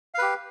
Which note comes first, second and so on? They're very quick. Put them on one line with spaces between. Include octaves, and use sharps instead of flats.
F5 B4 G4